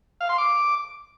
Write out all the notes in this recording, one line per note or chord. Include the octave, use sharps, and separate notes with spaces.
F5
C6
D6